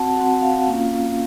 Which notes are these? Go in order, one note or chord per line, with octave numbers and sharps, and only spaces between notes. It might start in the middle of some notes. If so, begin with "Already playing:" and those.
Already playing: C4 F#4 F#5 A5
C4 F#4 F#5
F5
A#3 C#4 F4